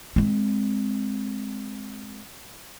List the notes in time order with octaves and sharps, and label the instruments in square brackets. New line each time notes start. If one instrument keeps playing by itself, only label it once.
[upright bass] G#3 C4